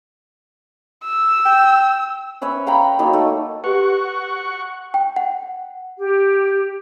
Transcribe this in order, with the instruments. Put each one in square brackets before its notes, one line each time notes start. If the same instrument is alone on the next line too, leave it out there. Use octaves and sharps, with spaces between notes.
[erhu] E6
[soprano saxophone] G5
[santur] C#4 B4 C#5 E5
F5 G5 A#5 B5
F#3 A#3 D#4 A5
A3
[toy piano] G4 B4 [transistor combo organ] F#5 C#6
[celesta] G5
F#5
[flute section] G4